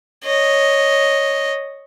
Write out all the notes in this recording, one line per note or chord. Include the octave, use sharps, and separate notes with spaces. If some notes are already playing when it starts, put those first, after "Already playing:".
C#5 D#5